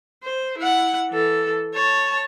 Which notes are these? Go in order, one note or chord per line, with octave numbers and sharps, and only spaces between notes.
C5
E4 F#5
E3 A4
C#5 A5